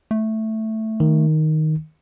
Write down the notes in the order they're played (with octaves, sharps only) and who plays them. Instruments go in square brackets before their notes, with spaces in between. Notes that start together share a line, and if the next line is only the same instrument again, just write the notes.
[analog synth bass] A3
[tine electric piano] D#3